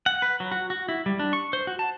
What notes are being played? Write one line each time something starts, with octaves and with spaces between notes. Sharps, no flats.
F#5
B4
F#3
F#4
F#4
E4
G3
D4
C#6
C5
F#4
A5